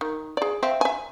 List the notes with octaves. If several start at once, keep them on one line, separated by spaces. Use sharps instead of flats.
D#3
G#4 D5
C4 E5 F5
E5 G#5